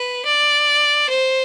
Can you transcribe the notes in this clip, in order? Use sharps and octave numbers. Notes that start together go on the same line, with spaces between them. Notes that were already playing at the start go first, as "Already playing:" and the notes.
Already playing: B4
D5
C5